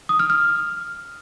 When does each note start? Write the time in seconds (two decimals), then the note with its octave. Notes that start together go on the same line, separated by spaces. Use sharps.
0.09 D#6
0.19 F6
0.30 F6